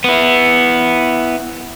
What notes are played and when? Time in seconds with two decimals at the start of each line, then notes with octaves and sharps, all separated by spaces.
0.04 B3 E4